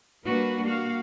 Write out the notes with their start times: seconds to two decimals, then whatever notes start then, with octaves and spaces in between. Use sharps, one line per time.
0.25 G3 A#3 D4 F#4 B4
0.67 A#3 F#4 F5